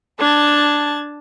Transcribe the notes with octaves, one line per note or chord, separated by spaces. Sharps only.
D4 A5 G#6